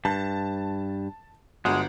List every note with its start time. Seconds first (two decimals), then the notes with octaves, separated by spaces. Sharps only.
0.05 G2 A5
1.65 G1 G#3 F#4